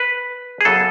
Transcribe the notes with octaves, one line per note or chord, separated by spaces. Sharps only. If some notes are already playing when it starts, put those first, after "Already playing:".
Already playing: B4
G#4
F#2 C#3 F#3 B3 A4